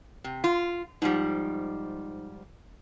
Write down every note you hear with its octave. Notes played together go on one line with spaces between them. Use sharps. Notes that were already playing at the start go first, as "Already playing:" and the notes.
C3
F4
G#2 F3 G3 D#4